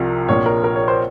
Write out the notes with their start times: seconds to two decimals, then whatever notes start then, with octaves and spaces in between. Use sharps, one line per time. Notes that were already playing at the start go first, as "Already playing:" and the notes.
Already playing: C2 C3 F3
0.28 A#1 A#2 F3 C#5
0.46 A#4
0.64 A#4
0.76 C#5
0.88 C5